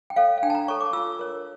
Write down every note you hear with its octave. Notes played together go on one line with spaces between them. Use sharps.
G5
A4 C#5 F5
F5
D4 G5
A5
A#5
A4 C#5 C#6
D6
F4 E6
A#4 C#5